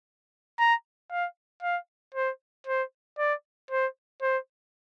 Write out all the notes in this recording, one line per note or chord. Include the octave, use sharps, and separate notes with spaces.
A#5
F5
F5
C5
C5
D5
C5
C5